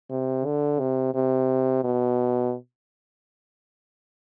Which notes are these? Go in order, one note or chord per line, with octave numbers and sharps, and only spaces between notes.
C3
D3
C3
C3
B2